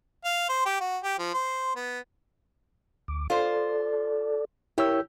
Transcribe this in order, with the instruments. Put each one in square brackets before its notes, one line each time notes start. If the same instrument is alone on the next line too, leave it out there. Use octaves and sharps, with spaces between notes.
[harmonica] F5
C5
G4
F#4
G4
F3
C5
B3
[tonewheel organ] D2 D6
[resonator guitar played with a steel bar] F4 C5 [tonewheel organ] A4 D5
[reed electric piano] E4 C#5 E6 [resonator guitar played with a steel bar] G4 [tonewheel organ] A#4